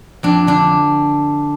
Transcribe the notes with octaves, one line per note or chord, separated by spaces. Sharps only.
F2 D4
D3 D4